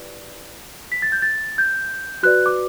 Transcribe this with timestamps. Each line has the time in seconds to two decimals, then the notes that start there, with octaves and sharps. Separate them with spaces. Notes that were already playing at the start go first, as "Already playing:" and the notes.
Already playing: E4 G4 B4 D5
0.92 B6
1.02 A6
1.12 G6
1.22 A6
1.58 G6
2.23 F#4 B4 D5 F#6
2.46 D6